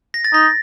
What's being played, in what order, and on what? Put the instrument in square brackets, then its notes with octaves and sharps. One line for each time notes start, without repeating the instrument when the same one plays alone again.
[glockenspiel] A#6
A6
[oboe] D#4 [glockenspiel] A#6